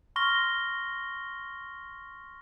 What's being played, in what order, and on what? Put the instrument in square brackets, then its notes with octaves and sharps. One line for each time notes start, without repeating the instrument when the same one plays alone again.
[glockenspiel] C6 C#6 F6 A#6 G7